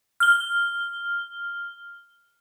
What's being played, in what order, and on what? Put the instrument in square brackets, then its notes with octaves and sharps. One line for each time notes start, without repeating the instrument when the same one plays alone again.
[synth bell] F6 G7